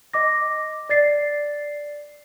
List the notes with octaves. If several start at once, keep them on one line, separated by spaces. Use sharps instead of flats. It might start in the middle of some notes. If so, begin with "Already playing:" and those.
D#5 D6 A#6
D5 A6 C7